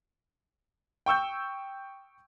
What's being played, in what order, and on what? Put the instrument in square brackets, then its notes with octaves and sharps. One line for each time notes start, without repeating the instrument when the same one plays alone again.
[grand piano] G5 C#6 E6 G6